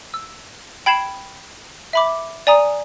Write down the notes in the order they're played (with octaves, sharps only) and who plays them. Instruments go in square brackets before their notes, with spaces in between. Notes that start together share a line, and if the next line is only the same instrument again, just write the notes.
[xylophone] E6
G5 B5 G#6 C7 E7
E5 B5 D6
D5 G#5 A#5 D#6